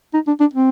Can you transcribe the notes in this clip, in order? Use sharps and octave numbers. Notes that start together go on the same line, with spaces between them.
D#4
D4
D4
C4